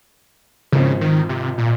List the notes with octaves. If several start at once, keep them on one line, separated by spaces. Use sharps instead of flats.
G#1 G#2 C#3 F3 C4
D#3
C3
A#2